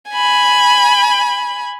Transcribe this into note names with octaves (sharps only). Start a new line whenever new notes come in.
G#5 B5